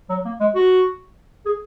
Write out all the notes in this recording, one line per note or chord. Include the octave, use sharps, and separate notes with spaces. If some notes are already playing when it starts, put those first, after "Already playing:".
F#3
A#3
G#3
F#4
G#4